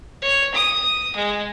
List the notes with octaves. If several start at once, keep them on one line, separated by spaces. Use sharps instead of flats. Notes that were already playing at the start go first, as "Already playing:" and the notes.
C#5
D#6
G#3